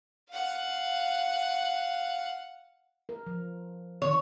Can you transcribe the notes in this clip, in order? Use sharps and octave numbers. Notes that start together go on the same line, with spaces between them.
F5 F#5
A#4
F3
D3 D#3 C#5